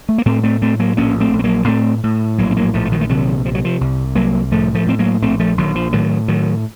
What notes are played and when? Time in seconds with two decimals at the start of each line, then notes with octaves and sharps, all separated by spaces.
0.09 A3
0.18 A#3
0.26 A2 A3 C4
0.44 A3 C4
0.62 A2 A3 C4
0.79 F#3 A#3
0.97 A#1 A#3 C#4
1.20 A3 C4
1.33 A#1
1.39 C4
1.44 F#3 A#3
1.67 A2 A3 C4
2.03 A2
2.38 A#1 F#3 A#3
2.51 C4
2.57 F#3 A#3
2.74 A#1 F3 A3
2.85 A3
2.92 D#3 F#3
3.01 A3
3.09 C3 D#3 F#3
3.45 C3 F3
3.55 F#3
3.65 F3
3.81 C2
4.15 C2 F#3 A#3
4.52 A2 F3 A3
4.75 F3 A3
4.87 A2 C4
4.99 F#3 A#3
5.22 A#1 A3 C4
5.40 F3 A3
5.57 A#1 D#3 F#3
5.75 F3
5.93 A2 D#3 F#3
6.28 A2 D#3 F#3